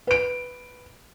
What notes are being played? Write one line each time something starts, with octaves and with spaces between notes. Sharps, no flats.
B4 D7